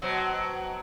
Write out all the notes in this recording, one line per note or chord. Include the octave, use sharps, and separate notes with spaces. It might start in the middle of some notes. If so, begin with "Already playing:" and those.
B2 F#3 C4